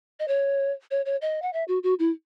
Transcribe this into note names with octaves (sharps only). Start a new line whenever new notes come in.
D#5
C#5
C#5
C#5
D#5
F#5
E5
F#4
F#4
E4